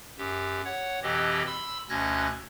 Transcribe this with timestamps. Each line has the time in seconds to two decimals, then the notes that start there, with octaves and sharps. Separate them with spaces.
0.18 F#2 G4
0.65 C#5 F#5
1.03 F2 B2 E3 C4 G4 D#5
1.47 B5 C6 E6
1.89 D2 B2 C#4 F#6 G#6 A#6